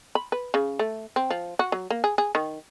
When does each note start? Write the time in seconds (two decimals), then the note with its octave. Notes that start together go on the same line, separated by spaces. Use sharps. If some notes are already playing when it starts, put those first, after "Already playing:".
0.15 B5
0.32 B4
0.54 C#3
0.79 A3
1.16 C4
1.30 F3
1.59 F#4
1.72 F#3
1.90 A#3
2.04 G#4
2.18 G#4
2.35 D#3